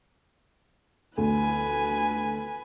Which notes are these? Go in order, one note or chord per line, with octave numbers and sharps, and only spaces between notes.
D2 B4 G#5